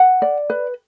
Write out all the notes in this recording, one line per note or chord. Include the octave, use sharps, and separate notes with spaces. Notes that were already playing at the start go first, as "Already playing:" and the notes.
Already playing: F#5
D5
B4